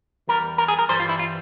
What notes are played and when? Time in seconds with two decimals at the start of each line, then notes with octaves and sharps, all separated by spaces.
0.28 E2 E3 G3 A#4
0.58 A#4
0.68 G#4
0.79 A#4
0.89 G2 E3 G3 C5
1.00 F4
1.09 E4
1.19 F4